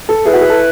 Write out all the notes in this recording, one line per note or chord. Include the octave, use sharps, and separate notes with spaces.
A4
E3 A3 E4 G#4 B4
F#4
G#4
A4